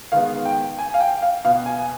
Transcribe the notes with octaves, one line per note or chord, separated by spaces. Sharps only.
D#3 G#3 B3 F5
G5
G#5
F5
G5
F5
B2 B3 F5
G#5